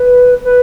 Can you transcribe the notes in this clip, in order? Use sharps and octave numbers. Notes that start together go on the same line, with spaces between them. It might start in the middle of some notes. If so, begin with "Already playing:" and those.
Already playing: B4
B4